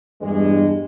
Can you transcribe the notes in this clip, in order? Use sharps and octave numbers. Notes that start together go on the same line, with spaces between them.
E2 G2 G#3